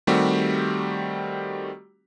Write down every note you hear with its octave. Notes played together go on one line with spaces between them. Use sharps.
D#3 G3 A3 C4 F#4 G4